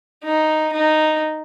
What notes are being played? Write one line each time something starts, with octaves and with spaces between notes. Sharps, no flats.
D#4
D#4